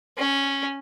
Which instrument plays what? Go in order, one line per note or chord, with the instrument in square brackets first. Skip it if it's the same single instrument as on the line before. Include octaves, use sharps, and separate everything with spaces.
[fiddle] C#4